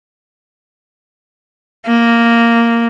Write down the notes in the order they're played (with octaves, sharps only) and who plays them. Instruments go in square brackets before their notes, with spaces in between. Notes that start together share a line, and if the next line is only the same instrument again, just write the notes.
[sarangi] A#3